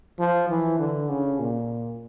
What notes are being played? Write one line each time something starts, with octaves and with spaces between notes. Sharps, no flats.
F3
E3
D3
C#3
A#2